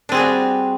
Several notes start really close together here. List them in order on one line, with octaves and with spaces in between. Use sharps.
D4 C4 G#4 F#4 G3